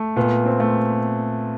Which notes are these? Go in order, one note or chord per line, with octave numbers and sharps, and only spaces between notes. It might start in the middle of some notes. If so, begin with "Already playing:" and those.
Already playing: A3
A#2 B3
C4
A3